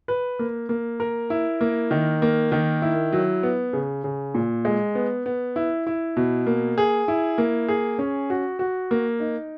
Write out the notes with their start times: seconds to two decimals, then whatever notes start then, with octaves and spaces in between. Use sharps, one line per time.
0.08 B4
0.39 A#3
0.69 A#3
1.00 A#4
1.30 E4
1.61 A#3
1.91 D#3
2.22 A#3
2.52 D#3
2.82 E4
3.13 F#3
3.43 B3
3.73 C#3
4.04 C#3
4.35 A#2
4.65 G#3
4.95 B3
5.26 B3
5.56 E4
5.87 E4
6.17 B2
6.46 A#3
6.78 G#4
7.08 E4
7.38 A#3
7.68 G#4
7.99 C#4
8.30 F#4
8.59 F#4
8.91 A#3
9.20 D#4